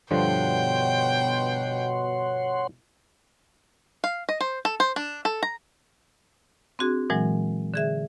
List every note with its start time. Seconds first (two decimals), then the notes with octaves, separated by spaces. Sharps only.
0.11 G2 B2 D3 F3 C#5 F#5 G5 C6
4.04 F5
4.29 D#5
4.41 C5
4.65 A4
4.80 C5
4.96 D4
5.25 A4
5.43 A#5
6.79 C4 D4 F#4 G#4
7.10 A#2 E3 F#3 G#3
7.74 D3 G#4 E5